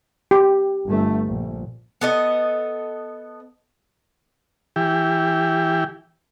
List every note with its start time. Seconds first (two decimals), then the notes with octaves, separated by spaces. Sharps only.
0.31 G4
0.87 G1 A3
1.26 A#1
2.01 B3 A4 D#5
4.76 E3 G4